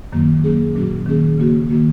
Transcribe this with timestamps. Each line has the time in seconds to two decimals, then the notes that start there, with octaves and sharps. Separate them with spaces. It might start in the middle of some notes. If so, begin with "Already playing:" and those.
0.12 F#2 D#3 F#3 A#3
0.44 F#3 A#3 C#4 G#4
0.75 A#2 F#3 C#4 F#4
1.06 D#3 A#3 C#4 G#4
1.38 C#3 A#3 F#4
1.69 D#3 A#3 F#4